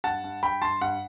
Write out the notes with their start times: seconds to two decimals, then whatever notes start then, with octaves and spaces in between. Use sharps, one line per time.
0.04 G2 F#5 A5
0.24 G2
0.42 G2 G5 B5
0.62 G2 A5 C6
0.81 G2 F#5